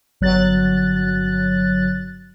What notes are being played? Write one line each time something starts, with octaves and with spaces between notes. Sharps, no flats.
G1 F#3 F#6 A6